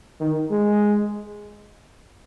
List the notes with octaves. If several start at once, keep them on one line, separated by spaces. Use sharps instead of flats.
D#3
G#3